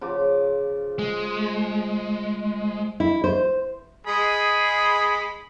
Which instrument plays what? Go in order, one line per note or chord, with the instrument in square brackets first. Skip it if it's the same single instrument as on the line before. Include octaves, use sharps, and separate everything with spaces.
[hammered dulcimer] C#3 F3 D6
[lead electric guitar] G#3
[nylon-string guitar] E4
C5
[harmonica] G#3 B5 [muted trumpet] G#4